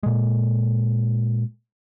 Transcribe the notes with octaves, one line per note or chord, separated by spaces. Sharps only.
A#2 G#3